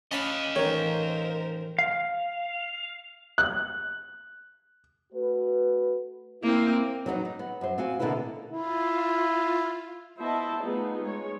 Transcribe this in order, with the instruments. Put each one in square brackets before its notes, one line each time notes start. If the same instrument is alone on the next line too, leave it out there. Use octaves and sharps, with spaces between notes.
[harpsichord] C#4 A5 B5 [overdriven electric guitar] D#5 F5
[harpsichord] A1 D#3 [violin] A#4 C5 [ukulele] C#5
[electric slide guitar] F5
[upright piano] F#6
[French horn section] A3 F#4 B4
[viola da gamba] A#3 C4 [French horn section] E4
[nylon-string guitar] F#3 B3 D4 D#4
D#4
B3
F#2 C5
C4 F#4 F5 F#5 G#5
B2 D3 A#3 B3 E4 B4
[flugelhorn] E4 [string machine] F4
[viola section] B3 E4 C5 D#5 E5 A5
A3 B3 D#4 F4 G#4
G#3 C#5